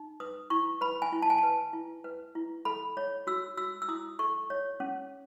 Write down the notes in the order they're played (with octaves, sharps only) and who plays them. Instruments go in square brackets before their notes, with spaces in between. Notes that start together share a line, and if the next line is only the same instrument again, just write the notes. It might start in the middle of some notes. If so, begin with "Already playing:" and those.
Already playing: [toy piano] D#4
B4 D#6
E4 C#6
B4 B5
G#5
E4
A5
G#5
B4 A5
E4
B4
E4
A4 B5
C#5
F#4 E6
F#4 E6
E6
E4 D#6
A4 C#6
C#5
C#4